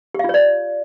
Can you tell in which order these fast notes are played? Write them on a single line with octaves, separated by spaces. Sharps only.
G4 F5 F4 C#5 D5